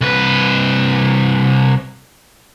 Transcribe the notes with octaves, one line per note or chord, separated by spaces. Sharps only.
C2 B4